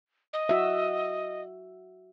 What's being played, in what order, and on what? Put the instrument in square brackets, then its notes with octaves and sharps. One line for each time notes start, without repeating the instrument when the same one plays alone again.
[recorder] D#5
[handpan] F#4 E5